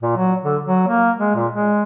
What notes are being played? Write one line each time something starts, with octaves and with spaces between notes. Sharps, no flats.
A#2
F#3
D3
F#3
A#3
G#3
A#2
G#3